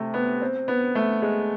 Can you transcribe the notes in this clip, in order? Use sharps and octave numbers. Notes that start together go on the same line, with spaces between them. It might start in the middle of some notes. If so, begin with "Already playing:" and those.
Already playing: C3 A3
B3
C4
B3
A3
G#3